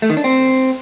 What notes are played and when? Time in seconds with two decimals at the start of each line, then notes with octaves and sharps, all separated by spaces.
0.02 A3
0.10 D#3
0.17 D4
0.24 C4